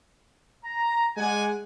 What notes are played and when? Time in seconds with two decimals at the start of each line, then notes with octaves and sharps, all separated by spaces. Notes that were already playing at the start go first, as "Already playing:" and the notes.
0.64 A#5
1.17 G#3 D5 F#5 G#5